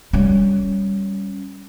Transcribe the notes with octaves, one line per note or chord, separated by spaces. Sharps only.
G3 C#4